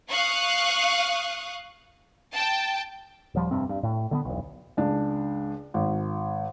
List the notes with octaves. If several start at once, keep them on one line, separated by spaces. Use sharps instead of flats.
F5 C#6 D#6 F#6
G5 A5
D#1 F3 G3
F1 G2 C3 C4
G2
A2
D3 A3 B3
E1 B1
C#2 D4
G#1